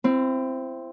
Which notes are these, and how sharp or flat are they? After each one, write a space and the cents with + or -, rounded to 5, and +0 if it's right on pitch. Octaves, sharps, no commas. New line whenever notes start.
C4 +0 E4 +35